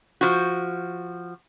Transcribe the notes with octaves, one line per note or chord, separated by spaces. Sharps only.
F3 F#4